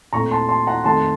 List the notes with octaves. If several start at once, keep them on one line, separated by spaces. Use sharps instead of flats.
A#2 A3 C4 A#5 C#6
A5 C6
A5 C6
F#5 A#5
F2 D#3 A3 A5 C6